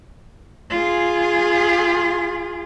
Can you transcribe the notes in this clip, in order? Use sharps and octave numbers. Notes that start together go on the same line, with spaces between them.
F4 G#4